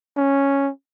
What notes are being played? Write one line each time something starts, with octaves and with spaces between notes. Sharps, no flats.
C#4